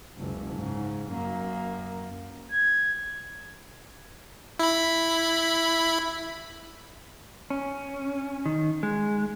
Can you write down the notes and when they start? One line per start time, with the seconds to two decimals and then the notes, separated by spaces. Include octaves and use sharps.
0.18 F#1 C#2
0.56 G#2 C#3
1.11 F#2 A#3
2.52 G#6
4.60 E4 B5
7.50 C#4
8.46 D#3
8.83 G#3